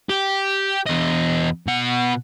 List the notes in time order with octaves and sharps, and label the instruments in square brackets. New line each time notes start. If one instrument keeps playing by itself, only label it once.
[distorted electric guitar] G4
E2 D#5
B2 F#5